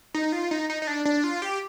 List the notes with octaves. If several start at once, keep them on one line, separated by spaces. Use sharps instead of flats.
D#4
F4
D#4
D#4
D#4
D4
D4
F4
G4